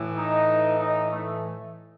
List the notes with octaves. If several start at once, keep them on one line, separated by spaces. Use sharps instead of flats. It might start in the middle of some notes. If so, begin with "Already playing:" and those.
Already playing: A2 E3
D#4
D#4
A3